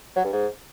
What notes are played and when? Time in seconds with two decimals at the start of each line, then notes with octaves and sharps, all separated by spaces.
0.16 F#3
0.25 G2
0.33 G#2